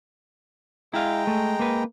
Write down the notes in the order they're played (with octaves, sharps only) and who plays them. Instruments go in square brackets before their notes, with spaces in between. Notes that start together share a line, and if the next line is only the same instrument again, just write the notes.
[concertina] G#3 G5 A#5 [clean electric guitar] E4 F5
[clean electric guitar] A3
A#3 B4